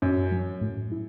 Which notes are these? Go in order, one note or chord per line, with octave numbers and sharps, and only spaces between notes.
F#2 C#4
F#3
A2
E4